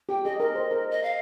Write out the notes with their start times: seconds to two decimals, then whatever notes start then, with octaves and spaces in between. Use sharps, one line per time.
0.09 G4 G5
0.25 G#4 D#5
0.40 A#4 D#5
0.55 C5
0.71 A#4
0.91 D#5
1.03 F5